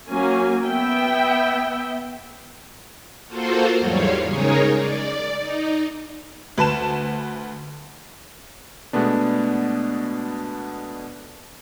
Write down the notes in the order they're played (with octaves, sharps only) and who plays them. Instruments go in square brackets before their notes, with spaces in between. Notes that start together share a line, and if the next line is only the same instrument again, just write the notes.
[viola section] F#3 A#3 C#4 G#5
B3 E5 G5
[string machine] A#3 F4 F#4 A4 C5
E2 G#2 F#3 G3 C#5 F5
C#3 G#3 D#4 G#4 A#4 C#5
D5
D#4
[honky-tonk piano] D2 B4 A5 E7
[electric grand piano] B2 G#3 A3 B3 D4